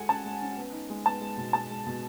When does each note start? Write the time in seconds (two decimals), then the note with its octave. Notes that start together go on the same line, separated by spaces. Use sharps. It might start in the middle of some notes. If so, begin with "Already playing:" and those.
Already playing: G#3 F#4 A4 F#5 G#5
0.09 C#4 A5
0.24 G#3
0.42 C#4
0.57 B3
0.73 D#4
0.90 G#3
1.06 B3 A5
1.21 G#3
1.37 B2
1.53 G#3 A5
1.70 G#3
1.87 B2